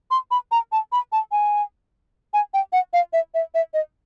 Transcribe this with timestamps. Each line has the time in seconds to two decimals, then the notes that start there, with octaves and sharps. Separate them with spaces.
0.11 C6
0.31 B5
0.52 A#5
0.72 A5
0.92 B5
1.12 A5
1.32 G#5
2.34 G#5
2.54 G5
2.73 F#5
2.93 F5
3.13 E5
3.34 E5
3.54 E5
3.74 D#5